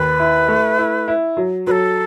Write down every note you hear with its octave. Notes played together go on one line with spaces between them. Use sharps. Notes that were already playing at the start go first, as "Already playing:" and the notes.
Already playing: D#2 B4
E4
A3
E4
E4
F#3
F#3 A4 B4